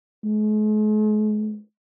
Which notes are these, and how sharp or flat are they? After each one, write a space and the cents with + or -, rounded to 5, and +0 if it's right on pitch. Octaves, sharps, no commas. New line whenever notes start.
G#3 +45